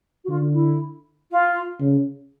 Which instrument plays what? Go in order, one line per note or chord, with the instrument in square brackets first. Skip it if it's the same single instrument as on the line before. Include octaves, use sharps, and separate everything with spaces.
[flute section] F#4
[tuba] D3 [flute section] F4
[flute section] E4
F4
[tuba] C#3